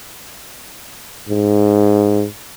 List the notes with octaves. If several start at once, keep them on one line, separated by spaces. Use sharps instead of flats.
G#2